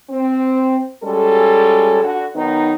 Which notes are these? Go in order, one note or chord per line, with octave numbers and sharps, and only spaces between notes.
C4
G3 G#3 C#4 F#4 A4
D3 F#4
D#3 F#3 B3 D#4